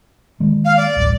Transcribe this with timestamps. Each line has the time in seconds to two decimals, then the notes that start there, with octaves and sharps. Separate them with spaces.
0.40 D#3 G#3 A#3
0.65 F5
0.77 D5
0.96 D1 A1 G3